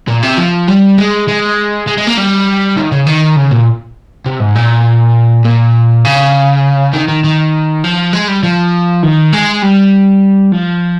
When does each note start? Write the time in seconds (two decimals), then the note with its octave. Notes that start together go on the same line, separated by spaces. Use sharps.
0.08 A#2
0.23 C3
0.38 F3
0.68 G3
0.98 G#3
1.28 G#3
1.87 G#3
1.97 G#3
2.07 A#3
2.17 G3
2.77 D#3
2.92 C#3
3.07 D#3
3.36 C#3
3.51 A#2
4.26 C3
4.40 G#2
4.56 A#2
5.45 A#2
6.05 C#3
6.93 D#3
7.08 D#3
7.24 D#3
7.84 F3
8.13 G#3
8.28 G3
8.43 F3
9.03 D#3
9.32 G#3
9.62 G3
10.52 F3